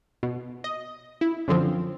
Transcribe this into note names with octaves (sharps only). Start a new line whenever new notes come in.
B2
D#5
E4
F#2 D3 F3 C4